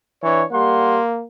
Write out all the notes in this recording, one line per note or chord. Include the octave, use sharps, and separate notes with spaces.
E3 D4 C#5
G3 A#3 F#5 C6